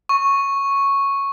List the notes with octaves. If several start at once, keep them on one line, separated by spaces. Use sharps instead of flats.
C#6